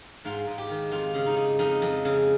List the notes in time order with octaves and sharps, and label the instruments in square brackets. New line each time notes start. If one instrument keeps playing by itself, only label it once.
[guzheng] G#2 F4
G#2
G4
D#3
F2 F4
C#3
D#4
C#3
F2 D#4
F2
C#3